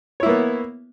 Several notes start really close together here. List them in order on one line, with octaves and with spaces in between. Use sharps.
C#5 E4 A#3 B3